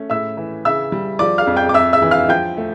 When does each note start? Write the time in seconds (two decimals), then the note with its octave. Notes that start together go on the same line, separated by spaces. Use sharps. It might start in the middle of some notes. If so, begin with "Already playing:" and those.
Already playing: A3 C#4
0.10 A2 E5 E6
0.37 E3
0.65 C#3 E5 E6
0.92 G3
1.19 F3 D5 D6
1.38 F5 F6
1.47 F2
1.56 G5 G6
1.69 D6
1.74 F2 E5 E6
1.93 E5 E6
2.02 E3
2.11 F5 F6
2.29 F3 G5 G6
2.57 A3